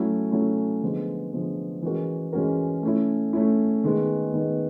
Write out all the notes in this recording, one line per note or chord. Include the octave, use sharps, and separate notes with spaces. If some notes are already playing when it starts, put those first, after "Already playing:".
Already playing: F#3 A3 C#4 E4
F#3 A3 C#4 E4
D3 F3 G#3 B3
D3 F3 G#3 B3
E3 G#3 C#4 F#4 A#4
E3 G#3 C#4 F#4 A#4
A3 C#4 E4
A3 C#4 E4
D#3 G#3 B3
D#3 G#3 B3